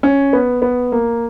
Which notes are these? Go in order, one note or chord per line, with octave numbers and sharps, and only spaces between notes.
C#4
B3
B3
A#3